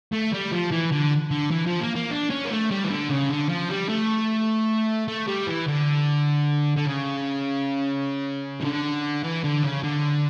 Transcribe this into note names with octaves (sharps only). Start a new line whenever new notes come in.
A3
G3
F3
E3
D3
D3
E3
F3
A#3
A#3
D4
C#4
A#3
A3
G3
E3
D3
C#3
D3
F3
G3
A3
A3
G3
E3
D3
D3
C#3
E3
D3
E3
D3
C#3
D3